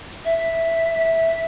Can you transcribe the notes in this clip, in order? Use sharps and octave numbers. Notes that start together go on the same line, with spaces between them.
E5